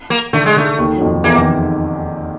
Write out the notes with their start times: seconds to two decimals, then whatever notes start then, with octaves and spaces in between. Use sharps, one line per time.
0.10 A#3
0.33 D3 A3
0.46 G#3
0.56 D3 A3
0.78 D#2 D#3
0.97 F#3
1.01 F2 F3
1.24 E2 E3 A#3
1.36 D#3